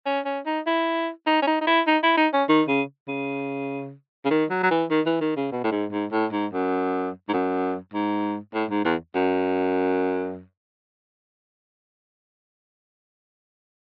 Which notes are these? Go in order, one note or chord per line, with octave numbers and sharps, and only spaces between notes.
C#4
C#4
D#4
E4
D#4
C#4
D#4
D#4
E4
D#4
E4
D#4
C#4
D#3
C#3
C#3
C#3
D#3
F#3
F#3
E3
D#3
E3
D#3
C#3
B2
A2
G#2
G#2
A2
G#2
F#2
G#2
F#2
G#2
A2
G#2
E2
F#2